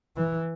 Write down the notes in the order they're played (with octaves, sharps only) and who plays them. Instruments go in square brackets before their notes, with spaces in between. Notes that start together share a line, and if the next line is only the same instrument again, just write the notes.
[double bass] E3